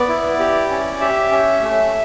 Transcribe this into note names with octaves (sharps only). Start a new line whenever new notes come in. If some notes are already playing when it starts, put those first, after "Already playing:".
Already playing: B3 D5
E4
G4
C#4
G4 E5
C#4
A3